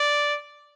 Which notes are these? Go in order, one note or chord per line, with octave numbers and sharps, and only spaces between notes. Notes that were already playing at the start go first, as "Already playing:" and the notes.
Already playing: D5